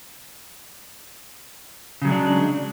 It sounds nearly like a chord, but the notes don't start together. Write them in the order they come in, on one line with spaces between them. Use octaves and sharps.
C#3 F#3 G#3 D4